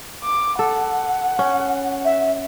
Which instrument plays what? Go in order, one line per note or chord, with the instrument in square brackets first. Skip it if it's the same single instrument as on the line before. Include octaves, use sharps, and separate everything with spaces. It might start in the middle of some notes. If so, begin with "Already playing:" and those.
[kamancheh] D6
[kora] A4 [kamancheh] F#5
[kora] C#4
[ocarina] E5